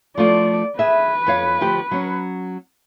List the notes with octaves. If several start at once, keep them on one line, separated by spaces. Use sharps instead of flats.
F3 A3 F4 D5
G#4 B4 E5
F2 C#5 F5
D2 F3 G4
F#3 C#4